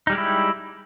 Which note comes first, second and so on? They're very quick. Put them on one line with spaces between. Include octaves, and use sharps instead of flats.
D#4 G3 G#3 G4 E4